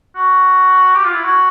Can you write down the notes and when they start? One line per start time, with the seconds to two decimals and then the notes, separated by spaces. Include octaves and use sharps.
0.16 F#4
0.95 G4
1.04 F4
1.14 E4
1.24 F#4